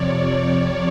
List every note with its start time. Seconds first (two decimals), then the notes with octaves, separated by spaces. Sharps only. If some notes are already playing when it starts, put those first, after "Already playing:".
Already playing: F2 C3 F3 C#5 D5
0.19 D5